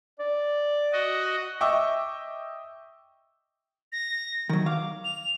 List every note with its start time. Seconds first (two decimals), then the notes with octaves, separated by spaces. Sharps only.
0.19 D5
0.93 F#4 D#5
1.61 D#5 E5 G5 C#6 D6 E6
3.92 A#6
4.49 D#3 F#3
4.66 F5 D6
5.04 F7